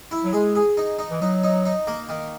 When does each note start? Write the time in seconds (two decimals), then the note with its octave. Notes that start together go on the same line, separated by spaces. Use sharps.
0.11 E4
0.24 F#3
0.33 G#3 G#4
0.56 G#4
0.77 D#4
0.99 D#4
1.10 E3
1.21 F#3 D#4
1.43 D#4
1.65 D#4
1.87 A#3
2.09 D#3